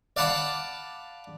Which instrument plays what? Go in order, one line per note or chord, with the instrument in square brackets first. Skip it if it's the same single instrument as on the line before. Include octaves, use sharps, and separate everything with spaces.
[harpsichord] D5 F5 F#5 A5 B5 D6